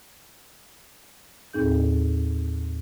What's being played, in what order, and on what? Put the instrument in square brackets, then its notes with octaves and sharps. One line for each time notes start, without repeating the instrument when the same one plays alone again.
[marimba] D#2 A2 C4 D#4 G#4 G6